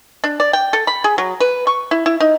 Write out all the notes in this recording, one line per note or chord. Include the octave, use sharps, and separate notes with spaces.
D4
D5
G5
A4
B5
G#4
F#3
B4
C#6
E4
E4
D#4